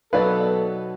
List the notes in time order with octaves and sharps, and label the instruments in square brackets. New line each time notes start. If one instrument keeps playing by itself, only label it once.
[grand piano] B2 F#3 D#4 [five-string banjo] B3 D5 F5 [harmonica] A4 [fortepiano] B4